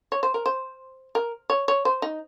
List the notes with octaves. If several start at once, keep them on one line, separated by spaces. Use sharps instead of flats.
C#5
C5
A#4
C5
A#4
C#5
C#5
C5
D#4